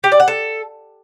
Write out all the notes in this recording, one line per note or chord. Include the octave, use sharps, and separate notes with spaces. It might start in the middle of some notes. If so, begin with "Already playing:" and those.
G4
D5
F#5
A4